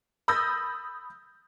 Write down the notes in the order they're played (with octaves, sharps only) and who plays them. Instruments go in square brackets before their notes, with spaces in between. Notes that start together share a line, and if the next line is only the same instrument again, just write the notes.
[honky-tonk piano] B5 D#6 E6 G6 A6 A#6